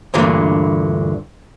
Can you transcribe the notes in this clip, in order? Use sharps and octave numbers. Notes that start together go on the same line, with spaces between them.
D2 G2 A#2 D3 E3